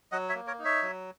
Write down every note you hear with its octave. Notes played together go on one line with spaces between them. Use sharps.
F#3 D#5 F#5
C#5 E5
A#3
A#4 C#5
D#4
C#5 E5
F#3